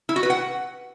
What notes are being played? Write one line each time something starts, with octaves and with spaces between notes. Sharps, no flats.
E4
F#4
B4
F#5